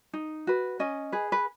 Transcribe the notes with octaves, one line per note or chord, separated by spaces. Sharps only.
D#4
F#4 B4
C#4 D#5
G#4 B4
B4